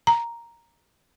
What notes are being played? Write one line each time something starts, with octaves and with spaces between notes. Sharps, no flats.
A#5